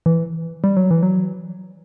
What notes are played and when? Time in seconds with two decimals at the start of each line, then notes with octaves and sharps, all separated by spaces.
0.06 E3
0.64 G3
0.77 F#3
0.91 E3
1.03 F#3